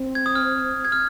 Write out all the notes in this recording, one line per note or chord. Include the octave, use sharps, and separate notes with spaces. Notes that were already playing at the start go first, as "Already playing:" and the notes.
Already playing: C4
G#6
D#6
F6
G#6
F6